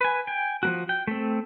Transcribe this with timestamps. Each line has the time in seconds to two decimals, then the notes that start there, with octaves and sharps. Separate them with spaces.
0.01 B4 G#5
0.27 G5 G#5
0.63 F3 A#3 F#4
0.89 G5
1.07 A3 C4